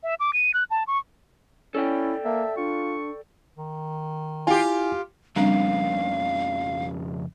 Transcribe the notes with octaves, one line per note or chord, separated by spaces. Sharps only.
E5
D6
D#7
F#6
A5
C#6
C#4 E4 A4 D5 G5
A#3 E5 A5
D4 F4 C#6
D#3
E4 F4 G4 G#5
F2 C#3 G3 C4 D4 F5